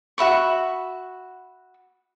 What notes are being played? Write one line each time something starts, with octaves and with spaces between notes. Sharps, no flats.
F#4 E5 B5 C#6